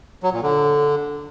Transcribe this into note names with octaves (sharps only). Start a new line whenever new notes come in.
F#3
A#2
D3